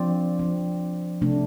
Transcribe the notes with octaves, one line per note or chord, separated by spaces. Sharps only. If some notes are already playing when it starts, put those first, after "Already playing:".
Already playing: F3 C4 D4 D5
F3 C4
C3 A3 D4